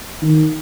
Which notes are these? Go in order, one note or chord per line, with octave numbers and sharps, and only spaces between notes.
D#3